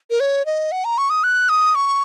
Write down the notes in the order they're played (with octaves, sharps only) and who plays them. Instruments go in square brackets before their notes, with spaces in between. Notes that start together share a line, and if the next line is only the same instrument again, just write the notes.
[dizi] A#4
C#5
D#5
F#5
A#5
C#6
D#6
F#6
D#6
C#6